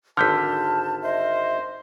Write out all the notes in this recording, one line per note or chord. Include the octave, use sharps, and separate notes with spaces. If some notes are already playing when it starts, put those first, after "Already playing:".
G#1 D3 A5 F6 G6 B6
C5 D#5 E5